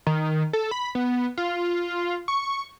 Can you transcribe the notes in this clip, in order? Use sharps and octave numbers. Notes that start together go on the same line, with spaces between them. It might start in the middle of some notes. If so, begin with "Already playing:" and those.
D#3
A4
B5
B3
F4
C#6